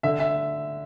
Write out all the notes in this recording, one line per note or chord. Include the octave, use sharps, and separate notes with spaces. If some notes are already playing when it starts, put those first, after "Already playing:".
D3 E5
E5